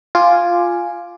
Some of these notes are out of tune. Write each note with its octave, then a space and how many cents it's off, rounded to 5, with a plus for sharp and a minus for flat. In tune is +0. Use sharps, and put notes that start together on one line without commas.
F4 +0 G#5 +0 D6 +5